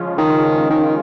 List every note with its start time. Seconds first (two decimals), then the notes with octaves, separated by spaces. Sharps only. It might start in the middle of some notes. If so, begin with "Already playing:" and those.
Already playing: C#3 F3 G#3 C#4 F4
0.18 D#3
0.70 D#3